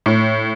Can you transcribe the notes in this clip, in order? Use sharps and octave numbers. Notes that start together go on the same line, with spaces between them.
A2